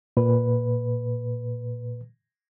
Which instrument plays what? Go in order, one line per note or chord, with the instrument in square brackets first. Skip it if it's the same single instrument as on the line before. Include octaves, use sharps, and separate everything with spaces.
[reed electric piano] A#2 B4